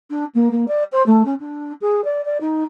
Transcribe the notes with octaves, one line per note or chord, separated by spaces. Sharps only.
D4
A#3
A#3
D5
C5
A3
C#4
D4
G#4
D5
D5
D#4